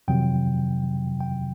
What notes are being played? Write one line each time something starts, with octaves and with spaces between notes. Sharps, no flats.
F2 C3 D#3 F#3 G5
G5